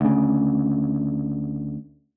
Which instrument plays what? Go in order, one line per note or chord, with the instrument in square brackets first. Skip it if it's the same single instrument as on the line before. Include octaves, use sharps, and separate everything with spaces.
[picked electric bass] D2 C#3